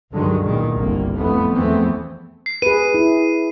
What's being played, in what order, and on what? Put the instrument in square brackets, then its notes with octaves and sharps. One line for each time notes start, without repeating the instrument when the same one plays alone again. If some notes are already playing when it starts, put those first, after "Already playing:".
[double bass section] C#2 G2 D3 D#3 F#3 G#3
E2 A#2 D#3
G1 C2 D3 A#3
F2 A2 E3 A3 B3
E2 E3 F3 A3 B3 C4
[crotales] C7
[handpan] G#4 B4 [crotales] D#7
[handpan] E4